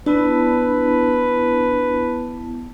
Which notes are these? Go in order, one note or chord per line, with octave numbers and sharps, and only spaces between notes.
B3 D4 E4 B4 A5